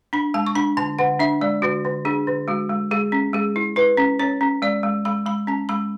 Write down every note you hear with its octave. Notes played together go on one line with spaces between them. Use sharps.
D4 B5
G#3 A5
C#6
D4 B5
D3 A5
D3 F#5
D4 E5
G#3 D5
D3 F#4
D3
D4 G#4
D3
G#3 F#4
G#3
G#3 G#4
C#4
G#3 G#4
E4
E4 B4
C#4
C#4 C#5
C#4
G#3 D5
G#3
G#3 B5
G#3 B5
C#4 A5
G#3 B5